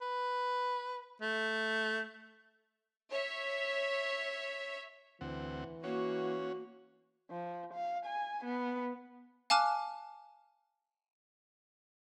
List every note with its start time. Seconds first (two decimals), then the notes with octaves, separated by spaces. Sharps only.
0.01 B4
1.21 A3
3.10 C#5 E5
5.21 D2 E3 C4 F#5
5.84 A#3 C#4 F#4 C#5 F#5
7.30 F3
7.74 F5
8.05 G#5
8.45 B3
9.50 F5 G#5 A5 D6 F6 F#6